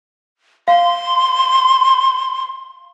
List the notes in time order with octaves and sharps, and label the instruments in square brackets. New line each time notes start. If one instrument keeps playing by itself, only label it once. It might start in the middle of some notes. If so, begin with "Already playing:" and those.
[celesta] F5 [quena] C6